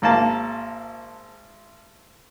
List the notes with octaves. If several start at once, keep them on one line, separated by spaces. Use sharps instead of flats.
G#1 A#3 A5